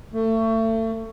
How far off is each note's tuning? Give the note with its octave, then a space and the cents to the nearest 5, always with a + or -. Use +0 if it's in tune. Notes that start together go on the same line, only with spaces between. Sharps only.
A3 +30